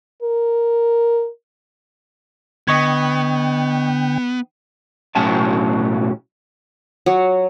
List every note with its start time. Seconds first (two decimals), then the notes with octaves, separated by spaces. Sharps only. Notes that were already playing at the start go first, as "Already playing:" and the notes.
0.23 A#4
2.68 D3 B3 D#5 G5 C#6 G#6
5.15 B1 A2 F#3 C#4 G#5 A5
7.06 F#3